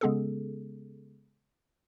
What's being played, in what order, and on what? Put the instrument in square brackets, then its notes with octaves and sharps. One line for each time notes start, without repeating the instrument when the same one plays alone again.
[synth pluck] C#3 G#3 B3 C#4 G#4 A4